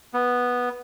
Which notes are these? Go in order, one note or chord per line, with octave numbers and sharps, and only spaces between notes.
B3